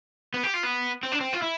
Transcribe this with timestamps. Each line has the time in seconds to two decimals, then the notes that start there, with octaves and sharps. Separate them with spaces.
0.34 B3
0.44 G4
0.54 F4
0.63 B3
1.03 C4
1.12 D4
1.21 C4
1.34 F4
1.42 E4